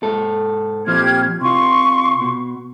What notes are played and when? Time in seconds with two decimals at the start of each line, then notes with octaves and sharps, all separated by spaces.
0.03 G#2 A4
0.87 A#2 F3 C4 G4 F6 G#6
1.41 C3 F4 C6 C#6
2.21 B2